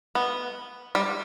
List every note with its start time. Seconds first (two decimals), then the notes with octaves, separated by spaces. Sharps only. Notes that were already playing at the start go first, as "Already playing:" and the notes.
0.15 B3
0.95 G3